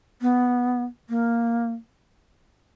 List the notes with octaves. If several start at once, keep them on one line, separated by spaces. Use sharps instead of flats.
B3
A#3